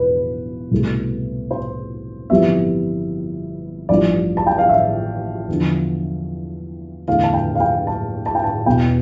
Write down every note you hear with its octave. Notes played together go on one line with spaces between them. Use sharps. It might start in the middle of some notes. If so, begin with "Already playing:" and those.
Already playing: E1 E2 B2 B4
C2 B2 A3
C5
G1 F2 E3 G3 B3 E5
A1 G2 F3 D5
A5
G5
F5
E5
E2 D3 F3
E2 D3 A3 F5
A5
G5
F5
G5
A5
A5
G5
A5
E1 E2 B2 B3 G5